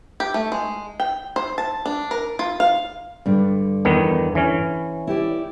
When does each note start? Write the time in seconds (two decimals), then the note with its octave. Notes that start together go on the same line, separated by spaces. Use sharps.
0.20 G4
0.34 A3
0.52 G#3
1.00 G5
1.36 C5
1.58 A5
1.86 D4
2.11 A#4
2.39 F4
2.60 F5
3.26 G2 D3
3.85 E2 D#3 B3
4.35 E3 C#4
5.07 E4 G4 D5